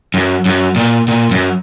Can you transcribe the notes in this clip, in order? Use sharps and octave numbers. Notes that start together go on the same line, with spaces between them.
F#2
F#2
A#2
A#2
F#2